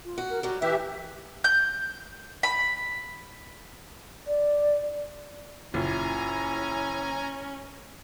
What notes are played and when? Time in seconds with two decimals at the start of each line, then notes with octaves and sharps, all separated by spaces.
0.05 F4
0.18 F#4
0.29 A#4
0.43 F#3 G3 F#4
0.62 E3 E4 G4 B4 E5
1.44 G6
2.43 B5
4.28 D5
5.74 F#1 A#2 C#4 E4 G#5 A#5